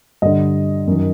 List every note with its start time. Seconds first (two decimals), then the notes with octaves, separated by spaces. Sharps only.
0.22 G2 D3 D#5
0.87 F#2 D#3